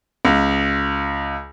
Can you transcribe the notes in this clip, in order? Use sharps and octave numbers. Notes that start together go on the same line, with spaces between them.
C#2